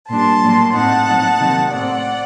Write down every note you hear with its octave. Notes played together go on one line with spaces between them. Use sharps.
A#2 G3 D4 A5 C6
A2 F#3 A#3 D4
A2 A3 C4 D#4 F#5 A5
A#2 F#3 C4 D#4
C3 D#3 F#3 C4 D#4
A2 A3 C4 D5 F#5